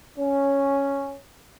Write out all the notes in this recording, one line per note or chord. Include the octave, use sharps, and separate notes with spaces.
C#4